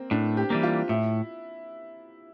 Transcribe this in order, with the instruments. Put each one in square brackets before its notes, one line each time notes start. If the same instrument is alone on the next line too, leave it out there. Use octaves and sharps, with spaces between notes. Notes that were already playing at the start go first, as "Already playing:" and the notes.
Already playing: [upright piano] A#3 C4
[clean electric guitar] A2 [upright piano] D4
[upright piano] G4
[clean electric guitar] E3 G3 A#3
[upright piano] F4
[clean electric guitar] A2 [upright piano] E4